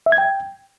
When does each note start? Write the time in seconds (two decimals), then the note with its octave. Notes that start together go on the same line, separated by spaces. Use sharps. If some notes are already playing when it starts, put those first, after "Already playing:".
0.06 E5
0.12 G#6
0.18 G5